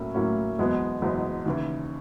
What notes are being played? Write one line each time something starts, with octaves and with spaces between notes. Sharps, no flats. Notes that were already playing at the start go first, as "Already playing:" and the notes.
Already playing: A2 F#3 A#3 C#4 E4
A2 F#3 A#3 C#4 E4
F#1 E2 B2 G#3 B3
F#1 E2 B2 G#3 B3
D#2 C#3 E3